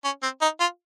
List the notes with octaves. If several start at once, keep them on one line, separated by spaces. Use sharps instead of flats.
C#4
C4
D#4
F4